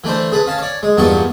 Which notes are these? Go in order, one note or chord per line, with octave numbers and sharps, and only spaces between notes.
E3 A3 D4 C5
G#4 A4 B4
C#4 F5 A5
C#5 D5
G#3
E2 G2 A#2 B3 A5 C#6